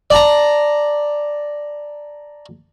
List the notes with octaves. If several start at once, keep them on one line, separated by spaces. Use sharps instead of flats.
D5 A5 A#5